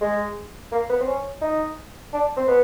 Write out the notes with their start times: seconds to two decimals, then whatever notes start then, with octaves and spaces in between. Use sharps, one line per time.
0.01 G#3
0.72 A#3
0.89 B3
1.00 C4
1.07 C#4
1.42 D#4
2.13 D4
2.37 C4
2.48 B3